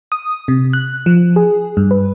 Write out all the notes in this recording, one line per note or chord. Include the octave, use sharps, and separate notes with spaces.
D#6
C3
F#6
F3
G#4
G2
B4